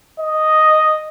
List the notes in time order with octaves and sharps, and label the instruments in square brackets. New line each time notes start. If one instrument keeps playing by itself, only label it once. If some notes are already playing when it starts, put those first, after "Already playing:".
[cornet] D#5